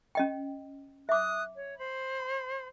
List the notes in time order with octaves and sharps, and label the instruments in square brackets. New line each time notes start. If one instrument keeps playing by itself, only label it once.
[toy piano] C#4 D#5 G5
[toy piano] E5 D6 [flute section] D#6 F#6
[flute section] C#5
C5 B5